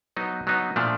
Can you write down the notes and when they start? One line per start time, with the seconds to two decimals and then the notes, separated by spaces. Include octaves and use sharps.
0.16 F#3 B3 D#4
0.47 F#3 B3 D#4
0.76 A#2 F3 A3 D4